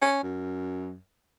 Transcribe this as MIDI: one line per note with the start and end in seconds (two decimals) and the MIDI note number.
0.02 0.22 61
0.23 0.97 42